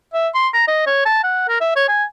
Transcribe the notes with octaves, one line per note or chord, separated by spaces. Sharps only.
E5
C6
A#5
D#5
C#5
A5
F#5
A#4
E5
C#5
G#5